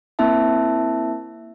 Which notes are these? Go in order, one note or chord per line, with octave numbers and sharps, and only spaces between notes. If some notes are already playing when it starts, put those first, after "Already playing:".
A#3 C4 E4 E5 A5